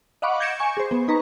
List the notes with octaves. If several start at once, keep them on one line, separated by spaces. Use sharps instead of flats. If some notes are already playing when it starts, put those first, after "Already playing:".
D#5 F5 F#5 B5 C#6 D6
G6 G#6 A#6 C#7 D7 E7
G#5 C#6
G#4 C5
B3
D#4 B4 A#5 C#6